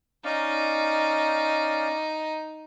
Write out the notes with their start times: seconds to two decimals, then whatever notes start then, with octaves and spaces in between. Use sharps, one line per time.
0.24 C#4 D#4 D5 F5